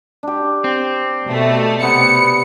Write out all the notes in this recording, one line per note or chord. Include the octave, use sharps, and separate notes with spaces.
D4 G4
C4
B2 A3
C3 B3 C#7